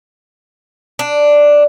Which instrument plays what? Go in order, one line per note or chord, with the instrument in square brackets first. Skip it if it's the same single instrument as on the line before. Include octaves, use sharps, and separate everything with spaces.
[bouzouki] D4